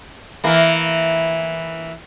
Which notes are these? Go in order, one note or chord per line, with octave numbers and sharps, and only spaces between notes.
E3 A#3